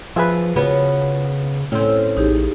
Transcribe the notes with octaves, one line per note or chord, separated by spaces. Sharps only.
F3 F4 G#4 B4 E5
C#3 B3 C#4 F#4
A2 C4 C#4 E4 A4
A#1 D#4 G4 G#4